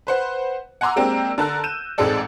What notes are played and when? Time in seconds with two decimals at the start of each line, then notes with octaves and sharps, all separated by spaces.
0.07 B4 C5 F#5
0.81 F#5 G#5 A#5 C6 D6 E6
0.96 G#3 A#3 C4 D4 G4 A#4
1.38 D3 A#4 A5 E6 F#6
1.64 G6 D#7 E7
1.98 A1 G#2 G#3 C4 A4 D5